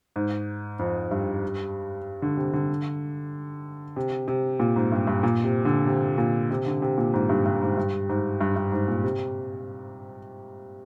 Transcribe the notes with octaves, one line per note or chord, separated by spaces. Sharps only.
G#2
F2
G2
D3
C3
D3
C3
C3
A#2
G#2
G2
G2
A#2
C3
D3
C3
A#2
C3
D3
C3
A#2
G#2
G2
G2
G#2
G2
G#2
G2
G2
G#2
A#2
C3